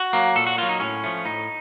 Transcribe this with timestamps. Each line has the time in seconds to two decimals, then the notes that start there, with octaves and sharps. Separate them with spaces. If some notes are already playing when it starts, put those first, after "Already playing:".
Already playing: F#4
0.13 F#3 A#3
0.36 A#2 A4
0.47 F#4
0.58 F#3 A#3 F4
0.69 D#4
0.80 A2 C#4
1.04 F3 A3
1.25 A2 D#4